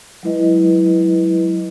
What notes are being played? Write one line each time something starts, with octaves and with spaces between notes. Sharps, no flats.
F#3 G#3 E4 B4 D#5